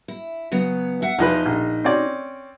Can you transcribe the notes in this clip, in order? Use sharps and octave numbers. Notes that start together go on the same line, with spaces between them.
E4
C#3 F#3 B3
E5 F#5
E2 F3 D#4 B4 D#5
A#1
C4 C#4 D5